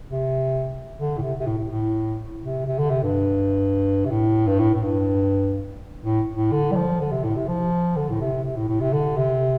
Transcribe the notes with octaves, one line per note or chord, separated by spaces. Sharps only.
C3
D3
A2
C3
C3
A2
A2
A2
C3
C3
D3
C3
G2
C3
A2
G2
A2
A2
G2
A2
A2
D3
G3
F3
D3
C3
A2
C3
F3
D3
A2
C3
C3
A2
A2
C3
D3
C3